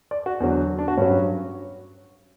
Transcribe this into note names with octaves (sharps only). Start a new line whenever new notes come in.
D5
F#4
E2 D3 F#3
D4
F#4
G2 F#3 C#4